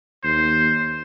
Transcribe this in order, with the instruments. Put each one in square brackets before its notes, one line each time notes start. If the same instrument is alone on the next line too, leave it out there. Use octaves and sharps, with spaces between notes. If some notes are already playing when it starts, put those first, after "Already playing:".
[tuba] D#2 [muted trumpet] C5